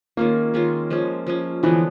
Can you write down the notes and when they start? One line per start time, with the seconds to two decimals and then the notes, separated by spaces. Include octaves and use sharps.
0.17 D#3 G#3 A#3 C#4 F4
0.54 D#3 G#3 C#4 F4
0.90 F3 G#3 C#4
1.27 F3 G#3 C#4
1.63 D3 E3 F3 G#3 B3